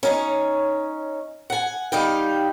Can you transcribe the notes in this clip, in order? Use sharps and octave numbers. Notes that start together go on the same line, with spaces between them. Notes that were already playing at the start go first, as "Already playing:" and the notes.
C#4 D#4 C#5
F#5 G#5
G3 D#4 F5 G5